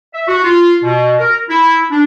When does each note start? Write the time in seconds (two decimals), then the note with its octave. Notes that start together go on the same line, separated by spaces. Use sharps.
0.14 E5
0.28 F#4
0.43 F4
0.83 B2
1.19 A#4
1.49 E4
1.91 D4